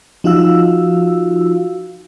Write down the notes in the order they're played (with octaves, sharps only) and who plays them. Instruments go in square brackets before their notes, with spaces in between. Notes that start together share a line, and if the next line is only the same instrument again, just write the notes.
[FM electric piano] F3 D#4 F4 F#4 F5 E6